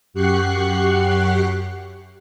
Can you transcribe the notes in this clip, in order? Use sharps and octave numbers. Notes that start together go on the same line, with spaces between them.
F#2 G4 F#5 C#6 F#6 C7